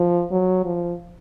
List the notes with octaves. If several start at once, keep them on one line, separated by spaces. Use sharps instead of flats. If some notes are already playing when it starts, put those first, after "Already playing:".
Already playing: F3
F#3
F3